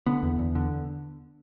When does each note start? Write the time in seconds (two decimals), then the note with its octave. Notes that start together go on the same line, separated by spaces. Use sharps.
0.06 D3 B3
0.23 E2
0.39 E2
0.55 D3